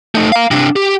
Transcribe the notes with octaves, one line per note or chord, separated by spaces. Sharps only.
A3 D#4
F5 A#5
C3 D4
G4